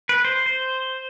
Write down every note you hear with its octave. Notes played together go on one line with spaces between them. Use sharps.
B4
C5
C5